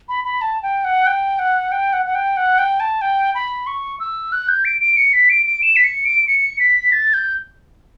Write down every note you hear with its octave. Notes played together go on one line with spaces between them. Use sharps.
B5
B5
A5
G5
F#5
G5
F#5
G5
F#5
F#5
G5
F#5
G5
A5
G5
B5
C#6
E6
F#6
G6
D7
D7
C#7
B6
D7
D7
E7
B6
C#7
D7
C#7
B6
A6
G6